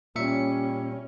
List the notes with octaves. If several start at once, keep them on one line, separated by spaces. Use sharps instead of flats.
A#2 G3 C#4 E5 C#7